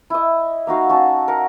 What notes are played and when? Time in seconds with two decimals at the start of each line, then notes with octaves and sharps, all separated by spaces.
0.10 E4 D#5
0.67 A#3 D#4 F#4 F5
0.89 C#4 F#4 A5
1.28 A#4 F#5